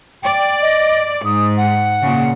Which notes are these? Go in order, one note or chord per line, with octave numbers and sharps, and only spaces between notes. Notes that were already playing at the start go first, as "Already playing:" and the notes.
D5 G5
D#5
G#2 D#6
F#5
A#2 C#3